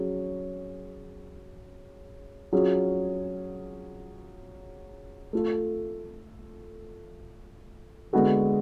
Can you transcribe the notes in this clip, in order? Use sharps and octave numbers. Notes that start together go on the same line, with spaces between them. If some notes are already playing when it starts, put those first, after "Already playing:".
Already playing: F#3 C#4 G#4 C#5
F#3 C#4 F4 G#4
A3 F4 A4
D3 G#3 B3 F#4 A4